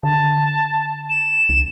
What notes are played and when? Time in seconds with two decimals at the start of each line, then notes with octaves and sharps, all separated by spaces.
0.03 D3 A5
1.10 E7
1.49 C2